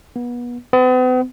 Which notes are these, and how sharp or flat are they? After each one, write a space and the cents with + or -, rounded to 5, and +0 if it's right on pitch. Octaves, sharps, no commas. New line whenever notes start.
B3 -30
B3 +45